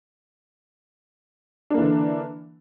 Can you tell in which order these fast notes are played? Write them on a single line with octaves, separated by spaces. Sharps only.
D4 A#3 E3 D3